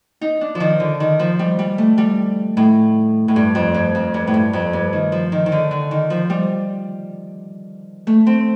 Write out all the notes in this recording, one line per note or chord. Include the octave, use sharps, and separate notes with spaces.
D#4
D4
F3
D#3
D3
D#3
F3
G3
G3
A3
G3
A2
A2
G2
F2
G2
F2
G2
A2
G2
F2
G2
D#3
F3
D#3
D#3
D3
D3
D#3
F3
G3
A3
C4